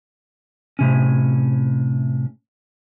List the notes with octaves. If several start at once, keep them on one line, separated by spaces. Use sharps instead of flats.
A2 C3 C#4